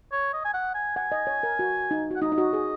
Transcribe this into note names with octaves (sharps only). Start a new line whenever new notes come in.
C#5
D#5
G#5
F#5
G#5
F#5 G#5
D#5
C#5
A#4
F#4
D#4
F#4 F#5
D#4 D#5
D#4
F#4
G#4